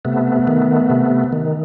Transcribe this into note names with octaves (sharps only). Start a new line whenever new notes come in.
C3 A3 B3
D#3
C3
D#3